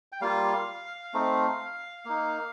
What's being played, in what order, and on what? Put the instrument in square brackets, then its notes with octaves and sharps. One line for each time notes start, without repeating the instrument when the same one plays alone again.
[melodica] G5
G3 A#3 F4 F5
A3 C4 D#4
A#3 D#4